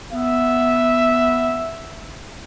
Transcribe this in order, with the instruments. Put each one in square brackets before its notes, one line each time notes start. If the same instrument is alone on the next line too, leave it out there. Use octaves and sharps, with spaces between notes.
[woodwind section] B3 [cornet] E5